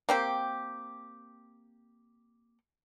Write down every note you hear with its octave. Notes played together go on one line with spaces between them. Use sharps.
A#3 C4 G4